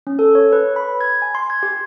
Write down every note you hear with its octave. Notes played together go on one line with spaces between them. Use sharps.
C#4
A4
C#5
B4
B5
G#6
G#5
C6
G#6
G4